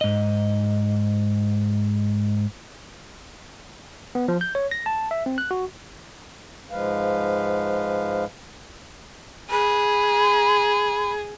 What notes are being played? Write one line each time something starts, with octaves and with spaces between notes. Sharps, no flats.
G#2 D#5
B3
F3
G6
C#5
A#6
A5
E5
C4
F#6
F#4
G#2 F3 G#3 B4 F5
G#4 B5